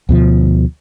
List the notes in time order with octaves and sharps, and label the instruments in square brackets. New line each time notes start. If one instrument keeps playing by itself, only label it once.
[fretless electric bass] D2 B2 F3